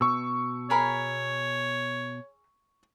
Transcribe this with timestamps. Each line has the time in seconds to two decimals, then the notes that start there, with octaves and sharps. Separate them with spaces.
0.01 B2 C#6 E6
0.70 G#4 A#4 C#5 B5